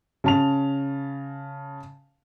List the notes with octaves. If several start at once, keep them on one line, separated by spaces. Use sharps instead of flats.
C#3 A5 F7